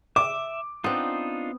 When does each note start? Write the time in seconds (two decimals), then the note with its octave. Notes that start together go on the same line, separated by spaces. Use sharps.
0.16 E5 D6
0.84 B3 C4 D4 D#4 F4